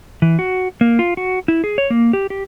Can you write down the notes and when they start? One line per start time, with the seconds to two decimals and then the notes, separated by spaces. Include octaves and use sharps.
0.22 E3
0.39 F#4
0.81 A#3
0.99 F4
1.17 F#4
1.48 E4
1.64 G#4
1.78 C#5
1.90 A#3
2.13 G4
2.30 G4